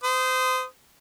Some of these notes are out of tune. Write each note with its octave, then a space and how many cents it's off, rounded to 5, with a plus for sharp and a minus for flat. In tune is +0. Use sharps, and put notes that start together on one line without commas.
C5 -30 D#6 +0